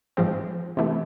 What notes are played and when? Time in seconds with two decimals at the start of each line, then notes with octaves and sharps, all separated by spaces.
0.17 G#2 F3 G#3 C4
0.77 C3 E3 A3